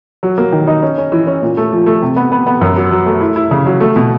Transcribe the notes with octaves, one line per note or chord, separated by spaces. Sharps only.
F#3
A#3
D#3
D#4
C#4
C#4
E3
C#4
A#2
A3
F3
A3
C3
B3
B3
B3
F#2
F#3
F#3
A3
E4
E4
C#3
F#3
A3
B2